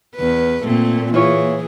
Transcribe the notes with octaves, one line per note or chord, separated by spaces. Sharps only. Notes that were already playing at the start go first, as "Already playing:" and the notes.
E2 B4
A#2 A3 C4
E3 E4 F4 G#4 C#5